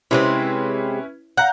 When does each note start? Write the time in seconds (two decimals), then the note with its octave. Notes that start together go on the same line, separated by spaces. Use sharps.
0.11 C3 G#3 C4 C#4 E4 B4
1.37 F5 F#5 A#5 G6